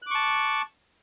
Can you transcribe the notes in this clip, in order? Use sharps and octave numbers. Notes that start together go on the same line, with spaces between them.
A5 C#6 D6 F#6